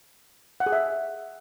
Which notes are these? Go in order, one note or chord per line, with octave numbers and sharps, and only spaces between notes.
F#5
G#4
E5